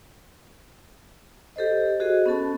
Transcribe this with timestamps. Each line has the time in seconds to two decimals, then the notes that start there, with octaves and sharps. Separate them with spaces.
1.56 G4 A4 C5 D#5
2.00 F#4 G#4 C5 D#5
2.26 B3 C#4 A4 A5